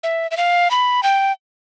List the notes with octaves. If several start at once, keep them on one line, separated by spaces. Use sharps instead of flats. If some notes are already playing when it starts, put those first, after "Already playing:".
E5
E5
F5
B5
G5